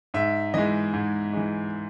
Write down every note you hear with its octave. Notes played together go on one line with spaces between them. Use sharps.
G#2 E5
E3 G#3 D#5
G#2
E3 G#3